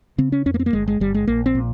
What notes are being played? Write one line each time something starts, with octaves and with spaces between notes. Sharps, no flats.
C#3 C4
C#4
F2 C#4
A#3
C4
A#3
G1 G#3
G#3
G1 G3
G#3
A#1 A#3
C4
A#2